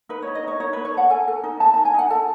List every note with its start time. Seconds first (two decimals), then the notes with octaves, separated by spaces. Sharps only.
0.09 D#4 B4
0.22 D#4 C#5
0.35 D#5
0.43 D#4 C#5
0.60 D#4 C#5
0.73 D#4 B4
0.85 C#5
0.94 A4 F#5
1.10 A4 G#5
1.28 A4
1.44 D#4
1.60 D#4 A5
1.74 D#4 A5
1.85 G#5
1.94 D#4 F#5
2.10 A4 A5